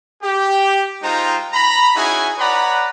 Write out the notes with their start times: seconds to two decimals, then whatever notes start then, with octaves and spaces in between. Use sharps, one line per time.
0.22 G4
1.03 G#3 D#4 F4 C5 G5 A#5
1.52 A#5 B5
1.96 C#4 D#4 E4 F#4 G#4 G#5
2.38 B4 C#5 D5 F#5 A#5 B5